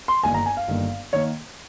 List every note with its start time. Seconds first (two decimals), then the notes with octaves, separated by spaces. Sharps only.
0.08 C6
0.23 G1 G2 D#3 A#3 G#5
0.34 A#5
0.46 G#5
0.57 F5
0.68 G1 G2 D#3 A#3
1.13 D#3 A#3 C#5